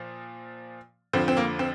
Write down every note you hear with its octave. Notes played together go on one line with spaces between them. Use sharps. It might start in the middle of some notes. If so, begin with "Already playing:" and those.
Already playing: A#2 F3
F2 D3 F3 C4
C4
A#3
C4